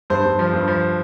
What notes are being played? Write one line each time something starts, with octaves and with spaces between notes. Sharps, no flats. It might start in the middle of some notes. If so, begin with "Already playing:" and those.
G2 C5
G2
F3
G2
F3